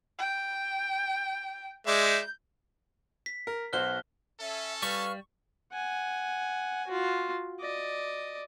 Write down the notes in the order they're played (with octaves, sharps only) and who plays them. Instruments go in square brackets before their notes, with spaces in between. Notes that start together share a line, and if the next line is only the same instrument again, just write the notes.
[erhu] G5
[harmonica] G#3 D5 E5 [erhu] G6
[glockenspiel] B6
[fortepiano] A#4
[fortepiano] B1 F#4 C5 [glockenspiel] F6 F#6 G7
[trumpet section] C#4 A4 [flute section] E5
[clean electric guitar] G3 [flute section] B4 F5 F6 [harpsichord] C#6
[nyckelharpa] F#5 G#5
F4 F#4
D5 D#5